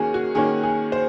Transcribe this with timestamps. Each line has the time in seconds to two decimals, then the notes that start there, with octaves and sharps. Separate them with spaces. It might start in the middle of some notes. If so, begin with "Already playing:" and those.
Already playing: D#3 A#3 C#4 F#4 G#4
0.14 F#4
0.35 D#3 A#3 C#4 G#4
0.63 G#4
0.92 C5